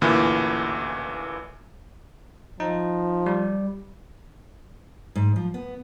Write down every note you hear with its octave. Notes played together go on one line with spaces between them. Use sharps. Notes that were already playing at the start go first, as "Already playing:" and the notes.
A1 D2 A#2 E3
F3 D#4
G3
G#2
F3
B3